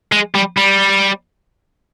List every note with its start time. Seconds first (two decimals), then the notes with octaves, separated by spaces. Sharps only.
0.12 G#3
0.35 G3
0.57 G3